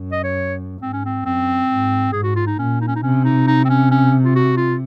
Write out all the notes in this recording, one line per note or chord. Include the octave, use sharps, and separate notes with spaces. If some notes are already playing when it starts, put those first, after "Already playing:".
Already playing: F#2
D#5
C#5
G#2 C4
C#4
C4
F#2 C4
G#2
G#2 G#4
F#4
F4
D#4
A#2 C#4
D#4
C#4
D#4
C3 C#4
D#4
D#4
C4
C#4
C#4
F4
F#4
F4